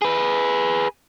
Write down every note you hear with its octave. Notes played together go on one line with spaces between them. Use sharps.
G#4 B4